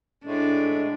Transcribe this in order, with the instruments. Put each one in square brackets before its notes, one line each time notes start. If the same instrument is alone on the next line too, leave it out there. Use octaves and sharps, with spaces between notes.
[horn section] A2 G#3 A3 [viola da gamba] D4